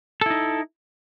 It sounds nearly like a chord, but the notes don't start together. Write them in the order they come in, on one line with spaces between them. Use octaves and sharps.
A4 E4 D#4